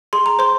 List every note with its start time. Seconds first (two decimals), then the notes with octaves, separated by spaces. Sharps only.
0.13 G#4 C6
0.26 A#5
0.39 C5 C6